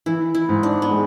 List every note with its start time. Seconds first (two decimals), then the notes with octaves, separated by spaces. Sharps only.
0.06 E3 E4
0.35 E4
0.49 G#2
0.63 D4
0.82 B3
0.91 G#3